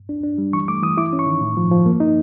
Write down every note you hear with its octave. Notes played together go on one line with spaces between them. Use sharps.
D4
D4
G3
E3 C#6
A3 D6
E3 D#6
E4 D6
C#4
C#6
D#3
A2
F3
F3
A#3
D#4